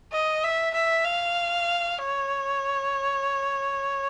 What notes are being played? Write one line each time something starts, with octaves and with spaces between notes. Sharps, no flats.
D#5
E5
E5
F5
C#5